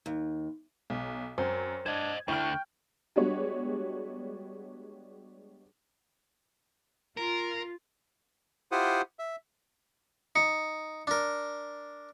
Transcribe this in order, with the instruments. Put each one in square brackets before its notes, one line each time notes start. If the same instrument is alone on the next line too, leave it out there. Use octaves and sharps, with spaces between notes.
[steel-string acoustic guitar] D#2
[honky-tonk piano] B1
[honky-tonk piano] F#2 [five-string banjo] C4
[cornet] D4 [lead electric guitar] C5 D#5 [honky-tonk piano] G#6
[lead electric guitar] D2 D3 [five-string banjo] E4 [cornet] G5 [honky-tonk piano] C#6 F6
[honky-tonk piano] G3 G#3 B3 D4 F#4 C#5
[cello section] F4 [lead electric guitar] A#4
[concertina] E4 F4 G4 C5 F#5 D#6
E5
[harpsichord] D#4 [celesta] C#7
[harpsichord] D4 A#4